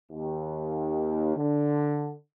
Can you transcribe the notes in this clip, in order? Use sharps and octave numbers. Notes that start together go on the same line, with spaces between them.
D#2
D3